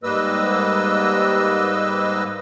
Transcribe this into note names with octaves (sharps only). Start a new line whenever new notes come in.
G#2 G3 A#3 B4 D#5 E6